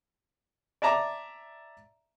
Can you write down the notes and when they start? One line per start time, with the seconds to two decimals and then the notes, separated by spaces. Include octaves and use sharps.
0.82 D5 E5 A5 A#5 D6